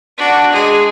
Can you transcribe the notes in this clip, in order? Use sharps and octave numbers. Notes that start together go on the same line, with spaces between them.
D4 F#4
G#3 G#4